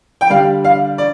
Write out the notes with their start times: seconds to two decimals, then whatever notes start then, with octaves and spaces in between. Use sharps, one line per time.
0.21 G5
0.29 D3 G3 D4 F5
0.65 F5
0.98 D5